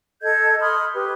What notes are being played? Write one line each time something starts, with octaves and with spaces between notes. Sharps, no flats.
A4 D#5 G6 G#6
B5 C6 D#6 F6
G4 B4